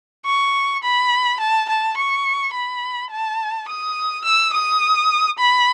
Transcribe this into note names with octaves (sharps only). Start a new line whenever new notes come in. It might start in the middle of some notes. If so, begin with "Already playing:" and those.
C#6
B5
A5
A5
C#6
B5
A5
D#6
E6
D#6
B5